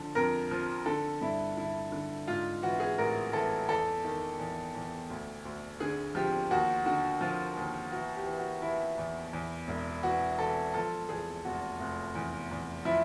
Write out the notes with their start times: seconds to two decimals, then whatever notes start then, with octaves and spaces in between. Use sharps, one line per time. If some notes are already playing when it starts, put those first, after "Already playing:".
Already playing: D3 F3 A4
0.15 F2 A#4
0.51 F3
0.86 D3 A4
1.21 G2 E4
1.57 D3 E4
1.92 D3
2.28 G#2 F4
2.63 E3 F#4
2.80 G#4
2.98 A1 A#4
3.33 E3 A4
3.68 E2 A4
4.04 D#3
4.39 E2
4.75 E2
5.10 D2
5.45 D2
5.80 D3 G#4
6.15 F3 G4
6.51 D#2 F#4
6.86 D3 F#4
7.21 F3 F4
7.57 D#2
7.92 E3 F#4
8.16 G4
8.27 E3
8.39 F#4
8.62 E3 E4
8.98 E2
9.33 E2
9.68 E1
10.03 E3 F#4
10.39 E3 A4
10.74 F3 A4
11.09 E2 G#4
11.45 F1 F#4
11.80 F1
12.15 E2
12.51 E2
12.85 F3 E4